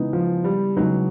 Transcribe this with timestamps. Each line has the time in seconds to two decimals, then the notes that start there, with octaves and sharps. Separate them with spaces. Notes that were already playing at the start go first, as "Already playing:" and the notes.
Already playing: C#3 E3 G#3 B3 D#4
0.13 F3
0.44 G3
0.76 C#3 E3 F#3 G#3 B3 D#4